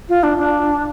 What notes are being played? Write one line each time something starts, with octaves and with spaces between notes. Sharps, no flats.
F4
D4
D4